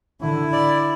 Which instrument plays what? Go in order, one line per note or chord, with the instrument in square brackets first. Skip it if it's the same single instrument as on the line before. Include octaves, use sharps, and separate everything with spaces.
[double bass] D3 [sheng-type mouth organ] E4
[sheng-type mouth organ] D5